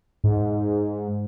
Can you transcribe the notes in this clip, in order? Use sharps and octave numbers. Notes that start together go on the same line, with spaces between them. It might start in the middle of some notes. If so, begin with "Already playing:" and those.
G#2